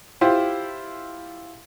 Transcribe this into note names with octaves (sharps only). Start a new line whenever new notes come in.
E4 F4 G4 C5